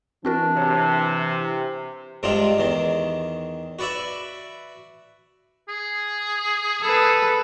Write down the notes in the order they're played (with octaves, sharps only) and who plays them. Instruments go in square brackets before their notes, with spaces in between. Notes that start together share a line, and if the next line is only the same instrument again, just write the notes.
[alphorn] E3 [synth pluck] C4 F#4 A#4 [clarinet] D4
[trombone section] C3 [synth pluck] C#5
[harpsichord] G2 C3 G#3 D4 F4
E2 D#3
F#4 B4 D5 E5
[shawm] G#4
[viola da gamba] A4 B4